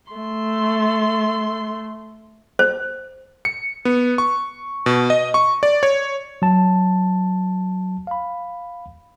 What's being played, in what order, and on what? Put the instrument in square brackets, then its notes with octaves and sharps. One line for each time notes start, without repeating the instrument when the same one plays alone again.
[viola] A3 C6
[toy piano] C5
[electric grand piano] C#7
B3
C#6
B2
D#5
C#6
D5
C#5
[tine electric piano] F#3 A5
F5 B5